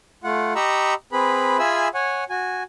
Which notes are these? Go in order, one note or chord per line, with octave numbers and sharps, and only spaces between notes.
A3 F4 F#5
G4 D#5 A#5 B5 C#6 E6
C4 G#4 B4 B5
F4 G#4 E5 G#5 B5 E6
C#5 F#5 G#5
F#4 G#5